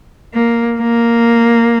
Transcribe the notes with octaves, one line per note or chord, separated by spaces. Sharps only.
A#3
A#3